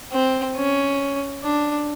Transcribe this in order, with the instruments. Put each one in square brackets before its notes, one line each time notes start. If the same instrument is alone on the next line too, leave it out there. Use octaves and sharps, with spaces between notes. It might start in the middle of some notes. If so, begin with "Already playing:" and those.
[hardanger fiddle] C4
C#4
D4